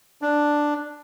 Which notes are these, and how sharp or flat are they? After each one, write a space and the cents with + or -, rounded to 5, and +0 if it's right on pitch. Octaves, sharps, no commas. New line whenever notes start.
D4 +5